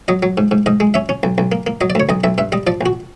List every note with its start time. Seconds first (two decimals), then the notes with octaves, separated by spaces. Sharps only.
0.08 F#3 D#5
0.23 F#3
0.38 G#2
0.51 G#2
0.66 G#2 D#5
0.80 G#3
0.94 C#4 E5
1.09 C#4
1.23 B1
1.38 B1
1.52 A#3
1.67 A#3
1.81 F#3 D#5
1.90 D5
1.95 D2 C#5
2.09 B1 D#5
2.24 B1 E5
2.38 G2 E5
2.52 G3 D#5
2.67 F3 D5
2.81 A#1 F#4